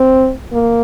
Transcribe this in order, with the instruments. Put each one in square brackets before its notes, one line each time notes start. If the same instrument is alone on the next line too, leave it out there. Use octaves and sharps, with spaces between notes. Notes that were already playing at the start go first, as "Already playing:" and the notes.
Already playing: [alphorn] C4
A#3